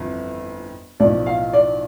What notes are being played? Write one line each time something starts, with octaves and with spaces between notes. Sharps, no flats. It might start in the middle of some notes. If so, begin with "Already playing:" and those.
Already playing: G1 F2 E3
B1 A2 F3 D5
F5
D5